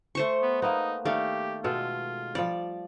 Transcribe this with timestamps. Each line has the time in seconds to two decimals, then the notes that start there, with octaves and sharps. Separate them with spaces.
0.15 A3 C5 C#6
0.42 B3
0.62 A#3 B3 D#4
1.05 D#3 A3 G4 D5 F5
1.64 B2 G#3 F4 A4
2.35 F3 G3 D5